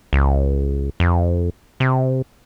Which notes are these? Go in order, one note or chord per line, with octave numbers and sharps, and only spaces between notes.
C#2
F2
C3